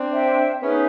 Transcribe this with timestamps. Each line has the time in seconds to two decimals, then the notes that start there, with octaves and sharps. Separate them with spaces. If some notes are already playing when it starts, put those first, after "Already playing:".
Already playing: C4 D4
0.10 C5 E5 G5
0.62 B3 C#4 D#4 G#4 B4 E5